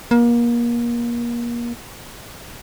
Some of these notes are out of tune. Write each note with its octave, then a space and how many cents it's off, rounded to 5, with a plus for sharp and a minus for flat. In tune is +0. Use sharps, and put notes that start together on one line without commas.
A#3 +30